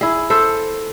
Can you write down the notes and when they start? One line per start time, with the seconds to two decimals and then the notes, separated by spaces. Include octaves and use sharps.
0.01 E4 G#4
0.30 A4 C5 E5